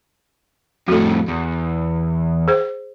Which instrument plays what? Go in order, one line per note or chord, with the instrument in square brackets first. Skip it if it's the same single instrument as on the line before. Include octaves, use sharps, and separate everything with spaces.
[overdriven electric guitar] F2 A2 [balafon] F#4 A4
[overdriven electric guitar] E2
[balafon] G#4 C5